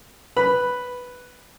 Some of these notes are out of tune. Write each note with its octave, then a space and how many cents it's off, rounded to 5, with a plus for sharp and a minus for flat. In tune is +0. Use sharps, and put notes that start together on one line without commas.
B4 +0 B5 +0